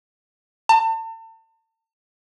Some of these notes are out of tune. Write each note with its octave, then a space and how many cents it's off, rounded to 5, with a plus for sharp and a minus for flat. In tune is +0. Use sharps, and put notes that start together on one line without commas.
A5 +40